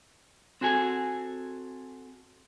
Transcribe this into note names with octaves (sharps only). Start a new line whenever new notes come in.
C4 F#4 G#4 A4 G#5